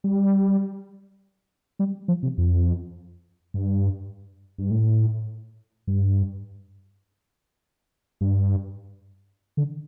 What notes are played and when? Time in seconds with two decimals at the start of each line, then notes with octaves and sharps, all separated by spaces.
0.04 G3
1.79 G3
2.08 F3
2.23 C3
2.38 F2
3.54 G2
4.58 G2
4.71 A2
5.87 G2
8.21 G2
9.57 D3